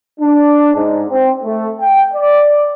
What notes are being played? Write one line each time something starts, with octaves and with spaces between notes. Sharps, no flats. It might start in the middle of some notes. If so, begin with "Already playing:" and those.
D4
G#2
C4
A3
G5
D5